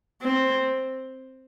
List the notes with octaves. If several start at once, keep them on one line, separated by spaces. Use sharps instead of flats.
C4